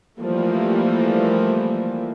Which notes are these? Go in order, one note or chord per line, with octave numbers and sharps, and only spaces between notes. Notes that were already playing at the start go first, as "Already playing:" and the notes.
E3 F3 G3 A3 A#3